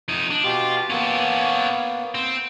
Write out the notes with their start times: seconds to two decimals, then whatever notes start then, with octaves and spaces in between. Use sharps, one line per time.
0.08 F2 D#4
0.30 D4
0.44 B2 F4 G4
0.90 A#3 B3 C#4 A4
2.15 C4